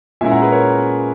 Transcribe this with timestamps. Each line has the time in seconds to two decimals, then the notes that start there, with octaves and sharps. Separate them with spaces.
0.21 A#2 G#3 C#4 E4 E5 G#5
0.31 F#5 A#5
0.41 G#4 B4
0.52 A#4 C#5